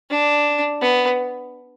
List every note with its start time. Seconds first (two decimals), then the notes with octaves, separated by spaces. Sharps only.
0.10 D4
0.82 B3